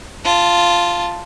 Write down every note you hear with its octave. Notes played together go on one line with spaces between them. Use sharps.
F4 A5